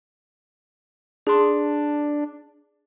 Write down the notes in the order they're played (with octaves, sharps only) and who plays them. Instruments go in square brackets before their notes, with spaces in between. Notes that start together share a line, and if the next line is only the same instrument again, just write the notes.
[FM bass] D4 [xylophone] G#4 C6